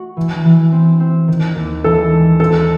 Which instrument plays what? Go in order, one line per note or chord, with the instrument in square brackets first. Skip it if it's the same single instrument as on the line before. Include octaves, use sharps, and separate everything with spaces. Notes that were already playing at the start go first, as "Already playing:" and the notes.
Already playing: [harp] A3 F#4
E3
E3
C4
C4
D#3
D#2
[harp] E3 [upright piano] A4
[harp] G#3
[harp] C4 [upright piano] A4